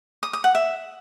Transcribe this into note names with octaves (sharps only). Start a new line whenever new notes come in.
D#6
D#6
F#5
E5